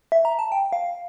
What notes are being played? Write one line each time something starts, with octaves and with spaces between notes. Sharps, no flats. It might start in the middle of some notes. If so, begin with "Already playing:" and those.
E5
A#5
A5
G5
F5